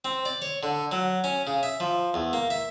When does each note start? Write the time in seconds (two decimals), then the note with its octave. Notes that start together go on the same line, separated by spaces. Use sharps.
0.05 C4
0.25 D5
0.42 C#5
0.63 D3
0.92 F#3
1.24 C#4
1.47 C#3
1.63 E5
1.80 F3
2.14 E2
2.33 A#3
2.50 E5